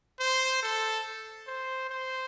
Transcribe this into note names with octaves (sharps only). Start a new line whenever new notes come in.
C5
A4
C5
C5